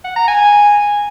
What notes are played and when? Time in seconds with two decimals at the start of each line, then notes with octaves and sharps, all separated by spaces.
0.04 F#5
0.16 A#5
0.28 G#5